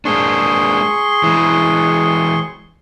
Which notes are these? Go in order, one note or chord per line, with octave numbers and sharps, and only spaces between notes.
G#3 A#3 D4 G#4 C6 C#6
E3 G#3